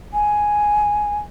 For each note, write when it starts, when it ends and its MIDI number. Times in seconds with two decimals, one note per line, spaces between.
0.14 1.18 80